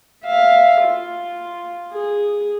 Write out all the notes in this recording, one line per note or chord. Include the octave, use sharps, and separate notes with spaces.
E5 F5
F4
G#4